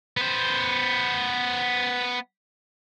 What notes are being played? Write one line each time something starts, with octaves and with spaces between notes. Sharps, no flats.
B3 C5